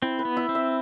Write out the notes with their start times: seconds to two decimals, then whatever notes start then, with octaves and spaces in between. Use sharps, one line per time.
0.02 C4 E4
0.19 B4
0.25 B3
0.37 E4
0.49 C4
0.55 E5